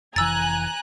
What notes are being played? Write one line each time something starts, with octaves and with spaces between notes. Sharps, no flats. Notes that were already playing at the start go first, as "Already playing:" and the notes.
F1 E3 G#5 A#5 E6 F#6 A6